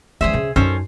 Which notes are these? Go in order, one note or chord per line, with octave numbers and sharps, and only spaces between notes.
C#2 E3 G#4 C5 E5
C#3 C#4
F#2 C#4 D#4 A4 C5